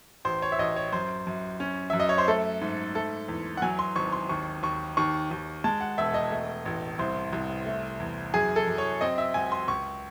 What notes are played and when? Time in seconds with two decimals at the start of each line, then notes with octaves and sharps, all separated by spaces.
0.25 A1 C5
0.42 C#5
0.52 E5
0.59 A1 D#5
0.76 C#5
0.92 F#2 C5
1.27 F#2
1.60 C#4
1.90 F#2 E5
2.00 D#5
2.09 C#5
2.18 C5
2.27 A3 A4
2.61 G#2
2.95 A3 A4
3.29 E2
3.57 F#5
3.62 F#3 G#5
3.79 C6
3.96 G#1 C#6
4.12 C6
4.29 D#2 C#6
4.63 D#2 C#6
4.97 D#2 C#6
5.31 D#2
5.64 G#3 A5
5.81 F#5
5.98 E1 E5
6.14 D#5
6.31 A3
6.65 A1
6.99 C2 C5
7.33 C2
7.66 A3
8.00 E2
8.34 F#2 G#4
8.56 A4
8.67 F#2
8.78 C#5
9.01 C4 D#5
9.18 E5
9.34 C#2 G#5
9.52 C6
9.68 C#2 C#6